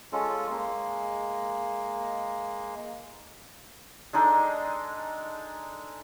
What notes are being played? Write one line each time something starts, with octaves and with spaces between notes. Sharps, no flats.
G#3 C#4 F4 A4
G#3 A#3
G#3 D4 D#4 A4